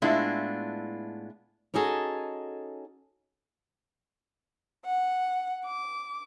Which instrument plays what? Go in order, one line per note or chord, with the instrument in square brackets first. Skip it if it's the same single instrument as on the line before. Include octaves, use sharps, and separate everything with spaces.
[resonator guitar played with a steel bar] A2 G#3 B3 D4 E4 F4
[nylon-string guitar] C#4 D#4 F#4 G#4 A4
[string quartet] F#5
D6